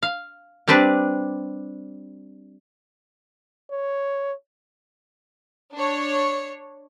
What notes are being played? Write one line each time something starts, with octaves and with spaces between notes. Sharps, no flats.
F5
G3 C4 D4 B4 D5
C#5
D4 C#5